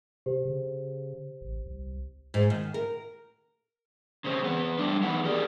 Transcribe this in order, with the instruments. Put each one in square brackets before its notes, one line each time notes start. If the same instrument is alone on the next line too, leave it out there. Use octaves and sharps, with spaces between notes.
[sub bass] C3 [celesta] G4 C5
[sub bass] C#3
A1
C2
[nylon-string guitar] G#2
D#3
A#4
[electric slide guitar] C#3 C4
E2 B3
G3 A3 D4
E3 B3 D#4 F#5
G4 G#4 A#4 D5